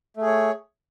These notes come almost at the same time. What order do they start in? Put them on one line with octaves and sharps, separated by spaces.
A3 G#4 C#5